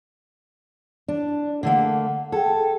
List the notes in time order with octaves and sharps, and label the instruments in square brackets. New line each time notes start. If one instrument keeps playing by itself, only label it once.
[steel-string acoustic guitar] D4
[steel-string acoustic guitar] D3 A3 A#3 [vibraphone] F#5
[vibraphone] G#4 G5 [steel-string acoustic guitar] A4